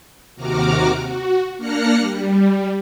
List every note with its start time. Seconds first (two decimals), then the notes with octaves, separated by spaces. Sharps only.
0.36 D#2 C3 F#4 A#5 D6 F6
1.06 F#4
1.57 A#3 D4 F6 F#6 A#6 C#7
1.98 G3